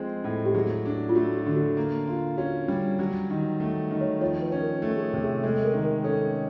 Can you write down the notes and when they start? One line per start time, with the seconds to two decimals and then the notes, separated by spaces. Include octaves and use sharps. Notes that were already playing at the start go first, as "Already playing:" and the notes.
Already playing: F3 G#3 C4
0.24 A2
0.46 G4
0.54 F#3 G#4
0.86 D4
1.09 F4
1.15 A3 F#4
1.36 F#4
1.46 D3
1.56 F#4
1.77 A#3
2.07 F4
2.38 C#4 F#4
2.68 G3
2.99 F#3
3.30 D#3
3.60 A3
3.91 D#3
4.01 C#5
4.21 F3 C#5
4.42 B4
4.52 C#4
4.61 A#4
4.82 A3 A4
4.96 G#4
5.03 A4
5.13 C3
5.23 G#4
5.44 G#3 A4
5.55 A4
5.65 A#4
5.74 D#3
5.84 A#4
6.04 C#4 A4